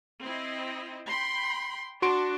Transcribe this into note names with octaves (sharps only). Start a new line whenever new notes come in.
C4 E4 D#5
G5 B5 C6
D4 F#4 C6 D7